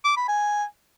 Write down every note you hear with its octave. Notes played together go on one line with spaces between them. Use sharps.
D6
B5
G#5